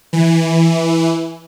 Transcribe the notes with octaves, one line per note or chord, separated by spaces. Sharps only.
E3